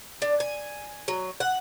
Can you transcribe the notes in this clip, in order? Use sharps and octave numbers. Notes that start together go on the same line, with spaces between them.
D4
G#5
F#3
F#5